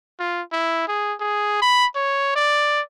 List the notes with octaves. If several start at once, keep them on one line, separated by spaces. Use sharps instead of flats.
F4
E4
G#4
G#4
B5
C#5
D5